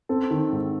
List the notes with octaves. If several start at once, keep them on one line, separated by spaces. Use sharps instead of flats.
C4 A4
D#3
G#2